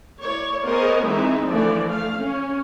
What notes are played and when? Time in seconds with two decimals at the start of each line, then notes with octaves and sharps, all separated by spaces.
0.19 E4 C#5 D5
0.65 B3 G#4 A#4 C5 C#5 D#5
1.04 E3 G#3 C4 D#4 E5
1.47 D3 E3 F3 A3 D5
1.85 A3 F5
2.20 C#4